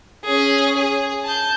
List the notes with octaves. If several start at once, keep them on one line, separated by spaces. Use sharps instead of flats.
C#4 G#4
G#4
A5 G6